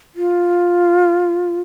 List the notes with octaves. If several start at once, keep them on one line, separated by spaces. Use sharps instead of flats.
F4